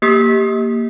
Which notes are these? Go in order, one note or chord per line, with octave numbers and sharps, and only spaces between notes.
A#3 G4 D#6 B6